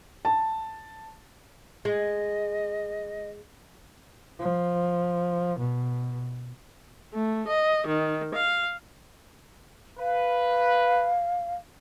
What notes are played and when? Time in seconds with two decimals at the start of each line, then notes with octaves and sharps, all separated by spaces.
0.25 A5
1.85 G#3 D#5
4.40 F3
5.59 B2
7.13 A3
7.47 D#5
7.86 D#3
8.33 F5
9.99 B4 F5